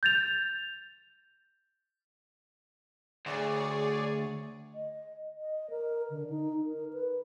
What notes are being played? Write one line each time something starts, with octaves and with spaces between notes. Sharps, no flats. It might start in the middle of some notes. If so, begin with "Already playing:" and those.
G6 A6 F7
D2 G#4 C#5 D5
D#5
D#5
A#4
D3
D#4
A#4
B4